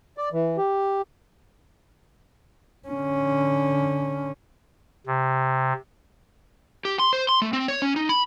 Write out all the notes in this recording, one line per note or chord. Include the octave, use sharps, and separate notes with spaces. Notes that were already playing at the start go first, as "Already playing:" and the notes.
D5
E3
G4
D3 C#4
C3
G4
C6
C5
C6
A3
C4
C#5
C#4
D#4
B5